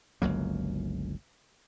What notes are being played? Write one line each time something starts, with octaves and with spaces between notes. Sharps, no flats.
G1 C#2 F#3 A#3